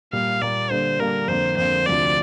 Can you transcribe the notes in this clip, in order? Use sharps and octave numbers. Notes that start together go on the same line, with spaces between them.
A#2 G3 A#3 F5
A#2 G3 A#3 D5
D3 G3 A#3 D4 C5
D3 G3 A#3 D4 A#4
F2 D3 A#3 C5
F2 D3 A#3 C5
D2 C3 F3 D4 D5